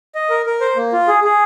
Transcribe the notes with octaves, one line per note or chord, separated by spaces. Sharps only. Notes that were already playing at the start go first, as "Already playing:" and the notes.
D#5
A#4
A#4
C5
A#3
F4
G#4
G#4